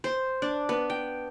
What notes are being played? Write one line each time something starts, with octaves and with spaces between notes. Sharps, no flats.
C5
D4
B3
G5